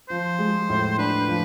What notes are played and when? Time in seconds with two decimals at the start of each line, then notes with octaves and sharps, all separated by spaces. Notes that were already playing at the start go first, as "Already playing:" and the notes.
0.09 F3 C5
0.39 G#3
0.69 A2
0.98 D4 B4
1.28 F3